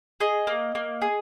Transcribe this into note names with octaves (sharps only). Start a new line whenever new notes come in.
G#4 D#5
A#3
A#3
G#4